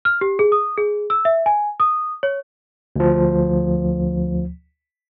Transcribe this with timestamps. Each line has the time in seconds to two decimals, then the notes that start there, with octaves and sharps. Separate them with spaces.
0.05 F6
0.21 G4
0.39 G#4
0.52 D#6
0.77 G#4
1.10 E6
1.25 E5
1.46 G#5
1.80 D#6
2.23 C#5
2.96 D2 F3